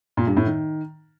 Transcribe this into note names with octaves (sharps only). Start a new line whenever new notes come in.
A#2
G2
A2
D#3